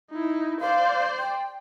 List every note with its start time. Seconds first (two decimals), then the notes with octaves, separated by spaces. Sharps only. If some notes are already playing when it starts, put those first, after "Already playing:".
0.11 D#4 E4
0.61 C5 D5 F5
1.19 G5